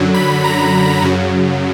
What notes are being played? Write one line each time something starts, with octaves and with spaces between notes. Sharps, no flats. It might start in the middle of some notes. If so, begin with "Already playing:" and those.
Already playing: F#2 D3 F#3
B5
A#5
F#2 C#3 F#3